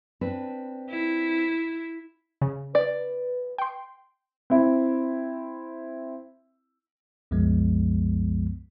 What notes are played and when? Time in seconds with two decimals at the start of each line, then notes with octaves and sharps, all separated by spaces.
0.21 C4 D4 B4
0.91 E4
2.42 C#3
2.75 B4 D5
3.58 G5 C6
4.50 C4 E4
7.31 C2 F#2 F3 G#3 B3